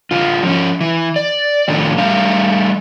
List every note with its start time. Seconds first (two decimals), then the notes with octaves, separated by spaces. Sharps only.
0.11 D3 F4
0.43 F3 C#4
0.81 E3
1.16 D5
1.68 A2 D#3 F3 C#4 D4 A4
1.98 G3 A3 F5